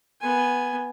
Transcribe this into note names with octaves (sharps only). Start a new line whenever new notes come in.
B3 G#5